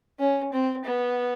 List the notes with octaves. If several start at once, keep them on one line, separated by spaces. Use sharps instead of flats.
C#4
C4
B3